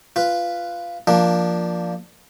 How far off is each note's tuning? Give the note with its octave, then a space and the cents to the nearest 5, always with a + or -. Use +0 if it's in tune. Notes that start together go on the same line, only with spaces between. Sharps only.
F4 -10 B4 +0
F3 +0 A#3 +0 D4 +10